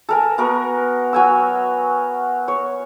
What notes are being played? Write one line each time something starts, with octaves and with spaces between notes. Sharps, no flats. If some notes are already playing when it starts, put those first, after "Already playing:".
A4 A#4 G#5
B3 F#4 A#4
F#3 G#5 E6
C#5